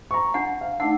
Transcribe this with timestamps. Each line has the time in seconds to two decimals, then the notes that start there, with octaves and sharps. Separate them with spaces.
0.11 A#5 C#6
0.34 D4 F#5
0.61 F5
0.80 A3 D4 D#4 F#5 E6